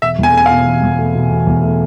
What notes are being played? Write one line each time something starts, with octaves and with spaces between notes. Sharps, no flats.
E1 E5
E2 G#5
A3 G#5
B2 F5
E1
E2
A3
B2
E1
E2
A3